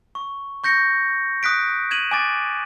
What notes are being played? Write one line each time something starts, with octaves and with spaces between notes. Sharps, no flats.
C#6
C#6 G6 A#6 C#7
D#6 F#6 B6 D7
G#6 D#7 E7 F#7
G#5 D6 A6